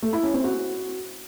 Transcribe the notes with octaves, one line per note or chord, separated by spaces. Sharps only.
A3
E4
C#4
C4
F#4